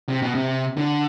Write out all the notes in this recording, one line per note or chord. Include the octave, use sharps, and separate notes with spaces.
C3
B2
C3
D3